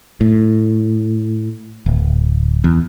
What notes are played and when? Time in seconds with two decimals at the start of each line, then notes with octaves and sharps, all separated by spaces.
0.21 A2
1.86 D1
2.64 E2